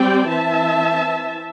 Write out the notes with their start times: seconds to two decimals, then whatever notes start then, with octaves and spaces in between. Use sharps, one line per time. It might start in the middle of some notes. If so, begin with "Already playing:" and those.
Already playing: G3 C4 D5 G5
0.27 E3 C4 E5 A5